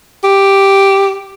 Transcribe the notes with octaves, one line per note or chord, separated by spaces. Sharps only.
G4